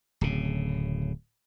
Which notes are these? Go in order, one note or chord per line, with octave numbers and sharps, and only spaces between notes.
D1 C#3